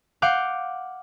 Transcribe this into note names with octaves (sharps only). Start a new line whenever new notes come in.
F5 F#5 D6 G6